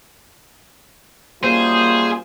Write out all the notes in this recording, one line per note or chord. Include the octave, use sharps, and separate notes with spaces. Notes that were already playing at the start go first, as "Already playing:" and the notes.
F#2 G3 A#3 F4 G#4 C5